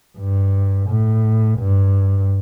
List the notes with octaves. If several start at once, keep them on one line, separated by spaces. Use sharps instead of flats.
G2
A2
G2